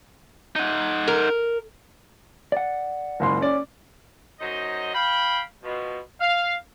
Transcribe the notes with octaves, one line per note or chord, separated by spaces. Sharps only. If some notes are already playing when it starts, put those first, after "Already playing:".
D#4 F#5
A#4
D5 F#5
F#1 C#2 C6
C#4 D5
F#2 F#3 D#4 C5 D#5
F5 G5 B5
B2 F3
F5